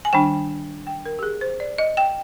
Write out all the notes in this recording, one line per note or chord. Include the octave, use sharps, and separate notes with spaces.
G#5
D#3 G3 D4 G5
G5
A#4
G4
G#4
C5
D5
D#5
G5